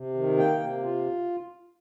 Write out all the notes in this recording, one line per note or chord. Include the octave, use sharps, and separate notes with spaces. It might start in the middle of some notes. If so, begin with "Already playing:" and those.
Already playing: C3
D#3
A#3 G5
C3
F4